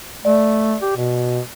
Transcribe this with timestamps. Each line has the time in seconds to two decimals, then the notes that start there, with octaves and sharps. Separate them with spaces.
0.25 A3 D5
0.82 G4
0.97 B2